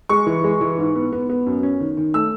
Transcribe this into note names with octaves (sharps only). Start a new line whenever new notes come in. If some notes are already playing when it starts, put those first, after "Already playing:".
G#3 C#6
E3
G#3
E3
G#2
B3
B3
B3
F#2
C#4
D#3
D#3
A3 E6